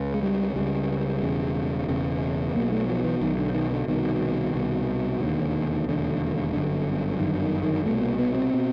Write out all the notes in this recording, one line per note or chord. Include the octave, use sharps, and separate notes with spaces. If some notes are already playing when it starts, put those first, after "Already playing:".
Already playing: C#2 C#3
G#3
G3
C#2 C#3 G3
E1 E2 C#3
E1 E2 C#3
B1 B2 A#3
A3
F3
E3
B1 B2 D#3
D3
D#3
D3
C2 B2 D#3
C2 B2
E1 D#2 D3 D#3
E1 D#2 D3
G1 F#2 D3
G1 F#2 D3 D#3
D#3
D#3
C2 B2 A3
A#3
B3
C4
B2